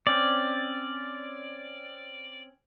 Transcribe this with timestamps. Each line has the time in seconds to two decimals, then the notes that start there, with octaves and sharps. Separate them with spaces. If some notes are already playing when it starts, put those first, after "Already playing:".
0.07 C4 C#4 D5